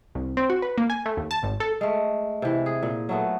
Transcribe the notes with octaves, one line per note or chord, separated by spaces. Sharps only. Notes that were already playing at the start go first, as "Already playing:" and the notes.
C2
C4
F#4
B4
A#3
G#5
A3
D#2
A5
G#1
A4
G#3 A3
C3 E3
G#4
A#2
F#3 A3 B3